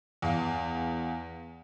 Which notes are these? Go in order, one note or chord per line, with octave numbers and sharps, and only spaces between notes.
E2 F5